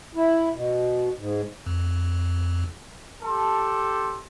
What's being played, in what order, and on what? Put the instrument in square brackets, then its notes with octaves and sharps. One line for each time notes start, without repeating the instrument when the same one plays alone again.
[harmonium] E4
B2
G#2
[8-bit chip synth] F2
[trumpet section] G4 A4 A5 C6